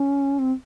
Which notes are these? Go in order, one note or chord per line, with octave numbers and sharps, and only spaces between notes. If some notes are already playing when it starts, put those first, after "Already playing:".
Already playing: C#4
C4